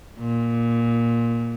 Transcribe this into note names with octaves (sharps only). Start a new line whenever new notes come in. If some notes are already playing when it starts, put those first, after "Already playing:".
A#2